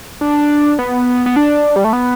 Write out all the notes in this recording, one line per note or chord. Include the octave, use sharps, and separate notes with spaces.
D4
B3
B3
D4
G3
A3
B3